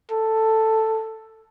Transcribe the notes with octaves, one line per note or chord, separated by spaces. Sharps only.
A4